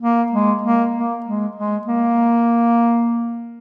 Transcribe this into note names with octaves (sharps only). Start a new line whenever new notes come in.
A#3
G#3
A#3
A#3
G#3
G#3
A#3